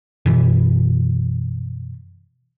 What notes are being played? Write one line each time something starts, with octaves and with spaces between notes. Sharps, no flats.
F#2 B2 E3